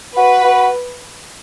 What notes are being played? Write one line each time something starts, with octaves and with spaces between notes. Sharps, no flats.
F#4 B4
F#4